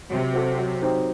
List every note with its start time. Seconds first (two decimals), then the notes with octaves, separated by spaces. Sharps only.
0.10 C3 F#3
0.34 C4 F#4 A4
0.58 F#3
0.82 C4 D#4 G4 C5